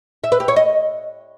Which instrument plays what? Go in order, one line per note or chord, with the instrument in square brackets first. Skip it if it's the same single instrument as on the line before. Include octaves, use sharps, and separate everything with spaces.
[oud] E5
B4
G4
C#5
D#5